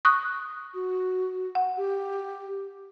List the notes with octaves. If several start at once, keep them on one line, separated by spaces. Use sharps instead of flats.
C#6 D#6 F#6
F#4
F#5
G4